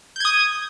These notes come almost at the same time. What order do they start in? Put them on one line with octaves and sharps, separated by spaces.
G6 G#6 D#6